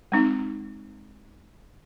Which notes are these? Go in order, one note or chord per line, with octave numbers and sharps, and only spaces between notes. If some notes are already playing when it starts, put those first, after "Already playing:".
G#3 C4 D#4